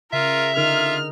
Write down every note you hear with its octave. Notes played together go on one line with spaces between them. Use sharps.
C#3 F4 A#4 E5
D3 D#4 F4 A#4 F6